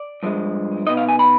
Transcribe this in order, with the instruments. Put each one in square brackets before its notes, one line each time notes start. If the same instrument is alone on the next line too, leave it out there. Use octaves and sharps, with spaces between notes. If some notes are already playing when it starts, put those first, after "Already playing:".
Already playing: [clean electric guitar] D5
G2 F3 G#3
B2 B3 D#4 D#5
F5
G#5
B5